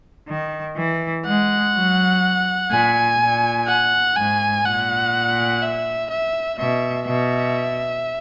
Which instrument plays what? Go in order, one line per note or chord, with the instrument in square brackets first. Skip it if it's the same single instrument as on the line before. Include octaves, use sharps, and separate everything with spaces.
[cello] D#3
E3
[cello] G#3 [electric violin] F#5
[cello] F#3
[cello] A#2 [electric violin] G#5
[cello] A#2
[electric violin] F#5
[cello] G#2 [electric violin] G#5
[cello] A#2 [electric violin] F#5
[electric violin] E5
E5
[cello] B2 [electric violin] E5
[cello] B2 [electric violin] E5